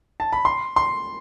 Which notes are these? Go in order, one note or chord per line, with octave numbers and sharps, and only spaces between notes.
A5
B5
C6
C6